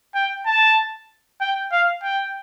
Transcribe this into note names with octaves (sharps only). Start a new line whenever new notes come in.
G5
A5
G5
F5
G5